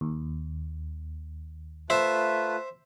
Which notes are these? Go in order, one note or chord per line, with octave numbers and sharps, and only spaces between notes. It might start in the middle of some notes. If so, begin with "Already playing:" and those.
D#2
A3 F4 B4 C5 E5